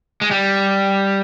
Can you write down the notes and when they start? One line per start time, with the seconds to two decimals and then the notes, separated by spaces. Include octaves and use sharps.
0.21 G#3
0.31 G3